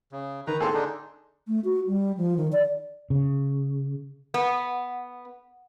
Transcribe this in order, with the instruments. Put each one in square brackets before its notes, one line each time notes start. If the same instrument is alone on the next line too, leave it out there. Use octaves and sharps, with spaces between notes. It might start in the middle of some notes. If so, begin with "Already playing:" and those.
[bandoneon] C#3
[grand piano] D#3 [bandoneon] B4 A#5
[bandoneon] A2 A#3 C4 [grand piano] G#4 A4 C6
[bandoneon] D3 D4 D#4
[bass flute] A3
F#4
G3
F3
D#3
D5
[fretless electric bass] C#3
[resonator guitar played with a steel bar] B3